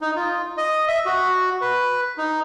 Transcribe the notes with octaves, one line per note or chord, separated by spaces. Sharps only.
D#4
F4
D#5
E5
F#4
B4
D#4